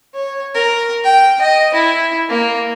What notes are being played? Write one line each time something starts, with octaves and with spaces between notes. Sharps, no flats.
C#5
A#4
G5
D#5
E4
A#3